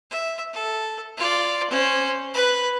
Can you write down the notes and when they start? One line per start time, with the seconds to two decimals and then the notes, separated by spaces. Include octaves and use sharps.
0.10 E5
0.53 A4
1.17 F4 D5
1.70 C#4 C5
2.33 B4 B5